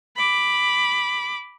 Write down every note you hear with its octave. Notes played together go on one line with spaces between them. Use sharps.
B5 D6